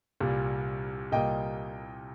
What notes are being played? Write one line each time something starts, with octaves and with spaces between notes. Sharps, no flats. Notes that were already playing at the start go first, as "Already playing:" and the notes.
C2 A#2 G3
C2 A#2 G3 A#3 D#5 G5